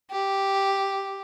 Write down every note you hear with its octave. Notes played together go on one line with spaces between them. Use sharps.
G4